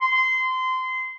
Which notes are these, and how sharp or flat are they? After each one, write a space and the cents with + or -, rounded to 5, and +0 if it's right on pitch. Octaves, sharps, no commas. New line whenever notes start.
C6 -20